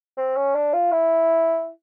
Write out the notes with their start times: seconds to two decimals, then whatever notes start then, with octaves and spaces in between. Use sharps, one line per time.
0.18 C4
0.36 C#4
0.55 D4
0.74 F4
0.92 E4